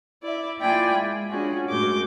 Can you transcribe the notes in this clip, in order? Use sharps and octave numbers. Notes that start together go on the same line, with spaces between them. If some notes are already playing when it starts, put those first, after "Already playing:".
E4 D5 E5
A#3 E4 F4 D5 G5 G#5
G#3
C#4 D4 F4 F#4 G#4
F#2 A2 G#3 F#4 D6 G6